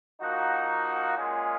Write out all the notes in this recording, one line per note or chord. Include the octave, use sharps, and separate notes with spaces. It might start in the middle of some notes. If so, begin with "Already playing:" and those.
F3 A#3 D#4 F#4
A#2 G#3 C#4 F4 G#4